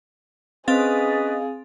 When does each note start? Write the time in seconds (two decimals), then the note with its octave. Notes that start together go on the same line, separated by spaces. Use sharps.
0.68 C4 C#4 G#4 B4 D#5 F5 A6